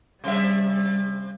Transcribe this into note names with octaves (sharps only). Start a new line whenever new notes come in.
C3 G3 E5